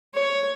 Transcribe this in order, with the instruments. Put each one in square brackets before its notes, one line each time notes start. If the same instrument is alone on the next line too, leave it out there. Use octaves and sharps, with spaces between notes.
[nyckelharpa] C#5